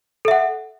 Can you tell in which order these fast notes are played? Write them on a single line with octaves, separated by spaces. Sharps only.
A4 E5 F#5